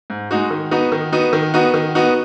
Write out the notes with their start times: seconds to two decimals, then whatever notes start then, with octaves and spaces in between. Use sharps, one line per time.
0.10 G#2
0.31 G#3 D#4 F#4
0.51 D#3
0.71 B3 D#4 F#4
0.92 D#3
1.12 B3 D#4 F#4
1.33 D#3
1.54 B3 D#4 F#4
1.74 D#3
1.95 B3 D#4 F#4